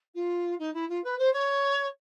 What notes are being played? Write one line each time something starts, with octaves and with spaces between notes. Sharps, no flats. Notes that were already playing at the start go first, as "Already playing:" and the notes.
F4
D#4
E4
F4
B4
C5
C#5